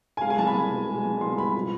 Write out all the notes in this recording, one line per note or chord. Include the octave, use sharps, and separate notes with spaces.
G#5
G#3 F5
G#5
C2 A5
B5
C2
B2
G#3
C2
C2 C6
B2 B5
F3